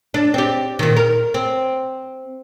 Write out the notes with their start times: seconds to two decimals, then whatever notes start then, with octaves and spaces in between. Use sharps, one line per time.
0.14 D4
0.34 C4 G4
0.79 A#2 D#3
0.97 A#4
1.34 C4